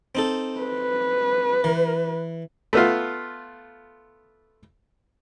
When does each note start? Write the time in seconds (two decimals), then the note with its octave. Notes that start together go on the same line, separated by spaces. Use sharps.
0.15 C4 D#4 A4
0.60 B4
1.64 E3
2.73 A3 B3 F4